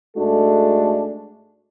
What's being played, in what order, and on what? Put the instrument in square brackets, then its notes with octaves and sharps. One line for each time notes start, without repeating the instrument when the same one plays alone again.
[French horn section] G#2 G#3 A3 D4 F#4 A4